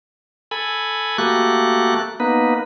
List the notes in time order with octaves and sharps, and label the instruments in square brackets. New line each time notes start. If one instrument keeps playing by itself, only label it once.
[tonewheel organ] A4 G#5 B5
A3 A#3 F#4 G4 A4 F#6
A#3 B3 D#4 B4